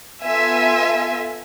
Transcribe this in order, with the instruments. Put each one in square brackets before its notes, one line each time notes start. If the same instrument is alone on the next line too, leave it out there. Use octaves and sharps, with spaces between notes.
[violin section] B3 F4 A4 E5 G#5